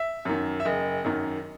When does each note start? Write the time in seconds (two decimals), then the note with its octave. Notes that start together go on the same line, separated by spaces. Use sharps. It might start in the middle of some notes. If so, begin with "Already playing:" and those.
Already playing: E5
0.25 F#2 D#3
0.60 E5
0.65 F#1 D#5
1.04 F#2 D#3